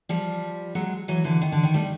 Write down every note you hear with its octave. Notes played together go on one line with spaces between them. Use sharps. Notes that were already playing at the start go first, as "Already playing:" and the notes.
F3 G3
F#3 G#3
E3 F#3
D3 E3
D#3
D3
D#3
G3 A3